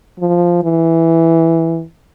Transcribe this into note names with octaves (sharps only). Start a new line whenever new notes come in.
F3
E3